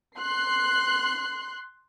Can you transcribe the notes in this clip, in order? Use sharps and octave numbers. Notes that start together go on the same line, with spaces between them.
C6 F#6 C7